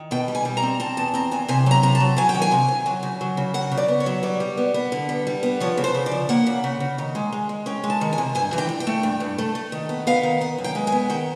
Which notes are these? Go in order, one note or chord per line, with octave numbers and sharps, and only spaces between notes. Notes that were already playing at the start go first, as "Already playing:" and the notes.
Already playing: D#3
B2 G5
G3
G#5
G3
A#5
C4
C4 A5
E2 A5
C4 A#5
E2 G#5
C3 G#5
F#3 A#5
C3 A#5
A5
F#3
F#3 G#5
G5
D#3
G#5
C3
C3
F#3
C#3
F#3
C#3
F#3 F#5
C#3
D5
B3
C#5
F#3
G3 D5
G3
B3
B3
D3
G3
G3
B3
F3 C#5
C#3
C5
C#3
D5
F3
A#3 F#5
C#3
C#3
C#3
D#3
G#3
G#3
G#3
C#4 G5
G#3
A5
D#3
G#5
C3
G2 G#5
E3
G5
G2
G5
A3
G2
G2
A3
A3
D#3
B3
B3 F5
D#3
B3 F#5
F#2
G5
G#3
G#5
B3
D#3 G5